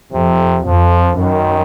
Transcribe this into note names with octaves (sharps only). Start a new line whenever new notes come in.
F2 C3
F2 F3
F#2 D#3